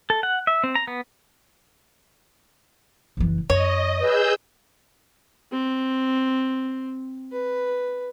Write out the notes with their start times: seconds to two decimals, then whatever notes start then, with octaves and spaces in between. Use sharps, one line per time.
0.10 A4
0.23 F#5
0.47 E5
0.64 C4
0.75 A#5
0.87 B3
3.17 F#1 E3
3.50 F#2 C#5 D#5
4.00 G#4 B4 E6 G6
5.52 C4
7.32 B4